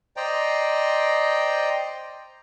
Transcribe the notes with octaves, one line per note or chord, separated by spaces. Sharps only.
C5 D5 D#5 G5 A#5